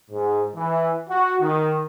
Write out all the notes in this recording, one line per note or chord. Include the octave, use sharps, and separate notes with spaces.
G#2
E3
F#4
D#3